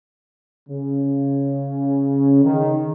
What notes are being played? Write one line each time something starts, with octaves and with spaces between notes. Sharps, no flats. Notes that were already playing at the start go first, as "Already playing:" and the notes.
C#3
D#3